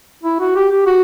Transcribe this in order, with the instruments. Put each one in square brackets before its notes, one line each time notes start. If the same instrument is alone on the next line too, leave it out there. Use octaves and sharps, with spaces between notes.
[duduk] E4
F#4
G4
G4
F#4